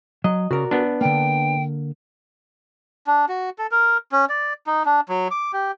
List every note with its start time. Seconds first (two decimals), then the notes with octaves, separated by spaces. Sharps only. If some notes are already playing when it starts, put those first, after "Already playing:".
0.24 F#3 D#5
0.51 C#3 F#4 A#4 D5
0.71 B3 D4
1.01 D3 A#3 G5
3.07 D4
3.29 F#4
3.58 A4
3.71 A#4
4.12 C#4
4.29 D5
4.67 D#4
4.86 D4
5.09 F#3
5.31 D6
5.53 G4